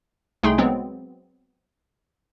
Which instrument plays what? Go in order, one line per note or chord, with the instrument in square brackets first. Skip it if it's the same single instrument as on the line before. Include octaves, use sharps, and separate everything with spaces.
[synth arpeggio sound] C2 A3 D#4 G#4 G5 C6
F#3 G#3 B3 C4